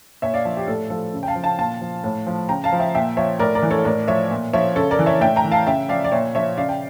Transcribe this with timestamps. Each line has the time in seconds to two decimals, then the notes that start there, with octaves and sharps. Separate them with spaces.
0.22 A#2 C#5 E5
0.34 D5 F5
0.45 F3
0.57 G4
0.68 A2 A4
0.90 F3 A4
1.13 C#3
1.23 G5
1.28 F5 A5
1.36 F3
1.44 F5 A5
1.59 A#2 F5 A5
1.81 F3
2.04 A2
2.27 F3
2.49 C#3 G5 A#5
2.64 F5 A5
2.72 F3
2.79 E5 G5
2.95 A#2 E5 G5
3.17 F3 C#5 E5
3.39 A2 A#4 D5
3.55 A#4 D5
3.63 E3
3.71 A4 C#5
3.85 A2 A#4 D5
4.08 F3 C#5 E5
4.30 A#2
4.53 F3 C#5 E5
4.76 C#3 A4 C#5
4.91 A#4 D5
4.99 E3
5.06 C#5 E5
5.21 A2 E5 G5
5.36 G5 A#5
5.44 E3
5.51 F5 A5
5.67 C#3 E5 G5
5.89 F3 D5 F5
6.04 D5
6.12 A#2 C#5 E5
6.35 F3 C#5 E5
6.57 C#3 D5 F5
6.69 G5